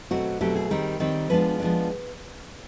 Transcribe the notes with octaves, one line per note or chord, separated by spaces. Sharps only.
B2 F#3 A3 C4 F#4
B2 F#3 A3 C4 G4
G#4
D#3 G3 C4 A#4
D#3 G3 C4
F3 G#3 B3 D4 B4
F3 G#3 B3 D4